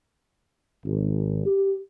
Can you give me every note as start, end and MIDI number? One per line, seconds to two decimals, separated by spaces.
0.85 1.45 32
1.46 1.76 67